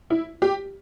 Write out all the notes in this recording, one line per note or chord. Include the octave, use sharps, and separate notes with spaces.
E4
G4